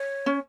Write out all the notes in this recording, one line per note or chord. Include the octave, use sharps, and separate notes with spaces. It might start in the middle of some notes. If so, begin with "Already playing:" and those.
Already playing: C#5
C#4